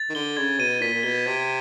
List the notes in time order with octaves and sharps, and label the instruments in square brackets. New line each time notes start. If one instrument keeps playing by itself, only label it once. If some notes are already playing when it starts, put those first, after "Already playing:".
Already playing: [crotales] A6
[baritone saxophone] D#3
[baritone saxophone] D3 [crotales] G7
[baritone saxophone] C#3 [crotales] G#6
[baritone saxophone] B2 [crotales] D#7
[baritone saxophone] A#2 [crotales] B6
[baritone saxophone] A#2
[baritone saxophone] B2 [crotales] G7
[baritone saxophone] C3 [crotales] G#6